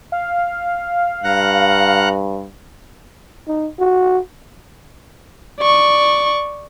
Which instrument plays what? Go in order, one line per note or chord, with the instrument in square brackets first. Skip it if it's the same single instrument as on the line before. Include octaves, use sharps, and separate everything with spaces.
[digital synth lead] F5
[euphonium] G2 [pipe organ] F#5 A#5 F#6
[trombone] D#4
F#4
[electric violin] D5 C#6